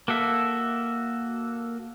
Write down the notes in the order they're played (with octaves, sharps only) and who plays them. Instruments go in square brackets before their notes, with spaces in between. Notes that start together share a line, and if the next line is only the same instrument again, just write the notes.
[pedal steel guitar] A#3 F#4 A4 E5